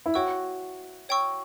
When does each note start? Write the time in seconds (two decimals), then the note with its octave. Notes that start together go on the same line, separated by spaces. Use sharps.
0.06 E4
0.14 F#4 C#5 G5 C#6 E6
1.09 C#5 G5 C#6 E6